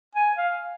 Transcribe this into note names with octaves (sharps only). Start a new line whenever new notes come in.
G#5
F5